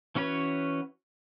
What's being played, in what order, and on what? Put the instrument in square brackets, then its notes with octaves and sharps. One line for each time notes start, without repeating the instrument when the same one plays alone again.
[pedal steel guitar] E3 C#4 F#4 B4 C#5